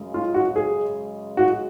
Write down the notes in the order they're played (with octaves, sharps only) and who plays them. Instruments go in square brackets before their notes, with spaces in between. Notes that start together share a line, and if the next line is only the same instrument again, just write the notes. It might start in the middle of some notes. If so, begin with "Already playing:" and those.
Already playing: [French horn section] F#2 C#3 G#3
[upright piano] F4
F#4
G#4
F#4